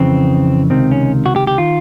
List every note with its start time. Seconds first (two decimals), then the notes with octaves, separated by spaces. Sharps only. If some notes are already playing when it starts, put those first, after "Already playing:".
Already playing: F2 C#3 E3 C4
0.70 C#2 C3 D#3 C4
0.92 C#4
1.26 F#4
1.36 G4
1.47 G4
1.58 D#3 F4